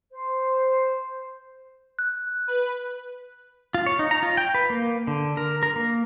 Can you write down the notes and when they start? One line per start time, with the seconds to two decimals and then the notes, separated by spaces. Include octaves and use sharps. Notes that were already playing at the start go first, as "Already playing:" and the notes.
0.12 C5
1.99 F#6
2.48 B4
3.74 F4
3.86 C#5
3.99 D#4
4.11 A#5
4.23 F4
4.37 G5
4.55 B4
4.70 A#3
5.07 D3
5.37 A#4
5.63 A#4
5.76 A#3